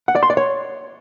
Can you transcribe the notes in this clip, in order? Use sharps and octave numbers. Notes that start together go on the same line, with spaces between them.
F#5
D5
C6
D5
C#5